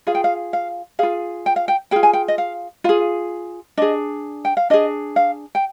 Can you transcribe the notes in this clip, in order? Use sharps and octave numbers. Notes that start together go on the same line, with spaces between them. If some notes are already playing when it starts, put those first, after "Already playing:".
F4 G#4 F5
G5
F5
F5
F4 G#4 F5
G5
F5
G5
F4 G#4 G5
G#5
G5
D#5
F5
F4 G#4 F5
D4 G#4 D#5
G5
F5
D4 G#4 D#5
F5
G5